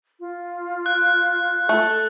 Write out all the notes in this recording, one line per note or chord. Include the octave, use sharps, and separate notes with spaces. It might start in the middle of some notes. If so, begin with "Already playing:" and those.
F4
F#6
A3 A4